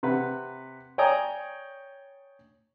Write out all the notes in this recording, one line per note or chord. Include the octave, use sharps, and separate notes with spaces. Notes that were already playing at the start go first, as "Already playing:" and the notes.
C3 B4 F#5
C#5 D5 G5 G#5 A#5 D#6